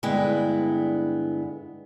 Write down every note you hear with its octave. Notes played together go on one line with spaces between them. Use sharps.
G2 D3 G#3 B3 E4 G5